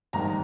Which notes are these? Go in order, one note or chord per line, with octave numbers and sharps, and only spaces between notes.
G#1 G2 D#3 A#5